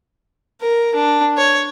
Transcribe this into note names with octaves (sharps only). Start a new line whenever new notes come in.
A#4
D4
C#5